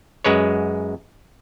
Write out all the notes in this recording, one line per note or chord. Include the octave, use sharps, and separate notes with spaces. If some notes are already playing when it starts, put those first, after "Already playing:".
F#2 G#3 B4 C#5